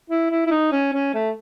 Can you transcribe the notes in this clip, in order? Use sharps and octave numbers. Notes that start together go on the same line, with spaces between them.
E4
E4
E4
D#4
C#4
C#4
A3